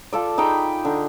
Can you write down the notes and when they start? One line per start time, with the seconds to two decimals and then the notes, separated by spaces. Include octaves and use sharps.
0.13 F4 A4 D5
0.38 D#4 G#4 G5 B5
0.85 D3